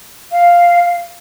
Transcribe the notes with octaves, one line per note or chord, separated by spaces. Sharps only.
F5